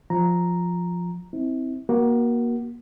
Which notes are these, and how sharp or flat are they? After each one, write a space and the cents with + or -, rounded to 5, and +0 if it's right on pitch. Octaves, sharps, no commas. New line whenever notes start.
F3 +10 A#5 +0
C4 +0 E4 -35
A#3 +25 F#4 +15